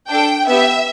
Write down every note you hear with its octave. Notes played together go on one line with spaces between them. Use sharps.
D4 A4 G5
B3 G4 E5